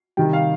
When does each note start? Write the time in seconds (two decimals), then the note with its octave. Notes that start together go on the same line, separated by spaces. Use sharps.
0.17 C3 D#3 G3 G5
0.33 F5